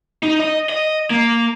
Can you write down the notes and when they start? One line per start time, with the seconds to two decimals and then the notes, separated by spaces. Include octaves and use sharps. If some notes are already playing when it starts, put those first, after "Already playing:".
0.23 D#4
0.40 D#5
0.69 D#5
1.10 A#3